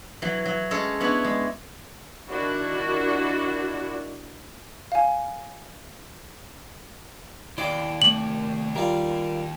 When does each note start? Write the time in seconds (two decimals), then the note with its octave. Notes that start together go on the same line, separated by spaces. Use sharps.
0.22 E3 F#3
0.45 F#3
0.71 G#3 C#4 A4 C#5
1.00 B3 D4 E4 C#5
1.24 G#3
2.28 D#3 D4 E4 F#4
4.92 F5 G#5
7.58 D#2 E4 D5 F5 G5
8.02 C3 A3 A#3 F#7
8.76 G3 F4 A#4